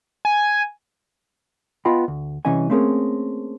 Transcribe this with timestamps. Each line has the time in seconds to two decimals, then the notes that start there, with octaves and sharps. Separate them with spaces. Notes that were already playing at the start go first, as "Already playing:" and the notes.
0.25 G#5
1.85 B3 F4 D#5 G5 A5 B5
2.08 D2
2.45 C2 C3 E3 C#4 D#5 G#5
2.70 A3 A#3 C4 C#4 G#4 A#4